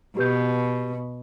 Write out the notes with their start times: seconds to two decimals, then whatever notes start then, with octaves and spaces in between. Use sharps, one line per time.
0.17 B2 G4 B4 G6